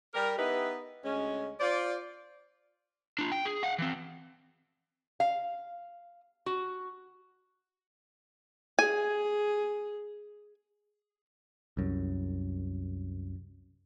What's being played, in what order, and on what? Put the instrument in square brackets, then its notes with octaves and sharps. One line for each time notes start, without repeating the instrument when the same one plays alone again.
[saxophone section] G3 A#4
B3 D#4 E4 G4 B4
D2 G#3 C#4
F4 C5 D5
[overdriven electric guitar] D4 F4
G5
G#4
F5 F#5
E3 C4
[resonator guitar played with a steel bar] F5
F#4
[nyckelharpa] G#4 [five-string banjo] G#5
[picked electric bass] C2 F#2